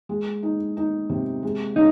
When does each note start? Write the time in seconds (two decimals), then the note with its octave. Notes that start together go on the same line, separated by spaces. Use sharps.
0.09 G#3
0.43 D#4
0.77 D#4
1.09 C3
1.43 G#3
1.76 C#3 D#4